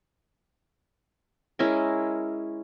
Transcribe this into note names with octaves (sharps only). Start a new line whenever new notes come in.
G#3 C#4 E4 A#4